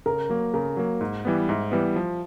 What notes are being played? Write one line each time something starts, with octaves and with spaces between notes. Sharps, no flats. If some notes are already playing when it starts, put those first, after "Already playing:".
C#3 A#4
F#3 A#3
C#3 A#4
F#3 A#3
G#2
E3 G3 B3
G#2 E5
E3 G3 B3
F3